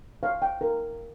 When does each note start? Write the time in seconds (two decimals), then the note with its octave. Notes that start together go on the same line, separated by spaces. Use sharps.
0.23 C#5 F5
0.42 G5
0.61 A#4